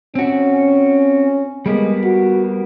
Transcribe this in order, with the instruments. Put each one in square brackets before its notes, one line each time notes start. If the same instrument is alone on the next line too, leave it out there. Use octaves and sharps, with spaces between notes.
[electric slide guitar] C4 F#4 [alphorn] C#4
[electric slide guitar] G3 A#3 B3 [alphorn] G#3
[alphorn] F#4